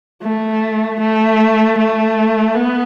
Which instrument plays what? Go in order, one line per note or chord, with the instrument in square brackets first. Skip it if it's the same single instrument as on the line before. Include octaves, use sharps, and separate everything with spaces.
[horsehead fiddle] A3
A3
A3
B3